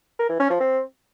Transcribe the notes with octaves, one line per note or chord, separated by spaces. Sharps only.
A#4
E3
C#4
F3
C4